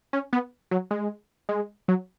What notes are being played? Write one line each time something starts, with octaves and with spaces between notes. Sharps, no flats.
C#4
B3
F#3
G#3
G#3
F#3